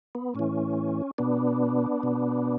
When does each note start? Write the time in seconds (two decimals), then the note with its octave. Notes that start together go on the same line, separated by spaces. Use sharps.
0.15 B3
0.35 A2 E3 C#4
1.18 B2 B3 D4
2.03 B2